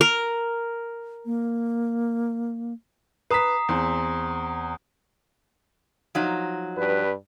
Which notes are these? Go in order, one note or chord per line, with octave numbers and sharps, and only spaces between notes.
A#4
A#3
B4 A#5 D#6 B6 C7
E2 C4
F3 F#3 D#4
G2 B4